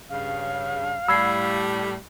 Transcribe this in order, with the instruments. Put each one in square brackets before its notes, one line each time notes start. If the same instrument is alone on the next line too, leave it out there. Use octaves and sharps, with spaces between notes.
[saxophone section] G2 C#3 [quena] F5
[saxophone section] A2 G3 [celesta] B5 G#6 C7 [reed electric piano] E6